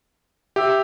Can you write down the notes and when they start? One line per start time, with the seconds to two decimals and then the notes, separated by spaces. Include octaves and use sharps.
0.56 G4 E5 G5 E6